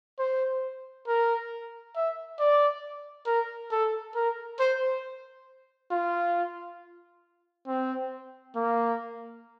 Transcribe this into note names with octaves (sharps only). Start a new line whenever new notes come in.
C5
A#4
E5
D5
A#4
A4
A#4
C5
F4
C4
A#3